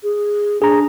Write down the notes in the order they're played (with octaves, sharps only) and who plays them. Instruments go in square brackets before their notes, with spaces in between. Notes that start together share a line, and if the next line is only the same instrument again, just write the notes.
[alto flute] G#4
[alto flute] D4 [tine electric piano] G#4 A#5